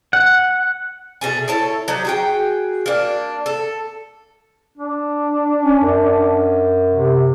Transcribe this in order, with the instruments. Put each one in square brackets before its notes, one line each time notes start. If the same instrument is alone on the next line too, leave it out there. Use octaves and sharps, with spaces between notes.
[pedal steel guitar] F#5
[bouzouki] B2 A3 G#4
E4 A4 C#5
F#3 D#4 G4
F#4 G#4 G5
A#3 D4
A4
[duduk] D4
[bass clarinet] C#4
F#2
[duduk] C3